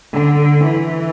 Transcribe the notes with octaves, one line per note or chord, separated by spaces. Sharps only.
D3
E3